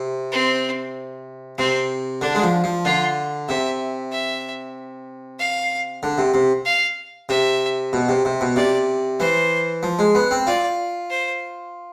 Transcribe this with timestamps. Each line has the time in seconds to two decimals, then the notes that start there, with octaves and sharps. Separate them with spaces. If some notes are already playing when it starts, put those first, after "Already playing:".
Already playing: C3
0.32 C4
1.58 C3 C4
2.21 D3 D4
2.35 G#3
2.42 F3
2.64 F3
2.85 D3 F4
3.49 C3 E5
4.12 E5
5.39 F5
6.03 D3
6.18 C3
6.34 C3
6.65 F5
7.29 C3 E5
7.93 B2
8.08 C3
8.25 C3
8.41 B2
8.56 C3 D5
9.20 E3 C5
9.83 F3
9.99 G#3
10.15 B3
10.31 C4
10.47 F4 D5
11.10 C5